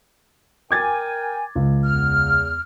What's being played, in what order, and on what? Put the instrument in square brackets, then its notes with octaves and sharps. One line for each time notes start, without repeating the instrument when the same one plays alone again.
[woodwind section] A#4 G5 G#5 [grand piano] D6 G#6 A6
[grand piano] C#2
[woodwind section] E2 F6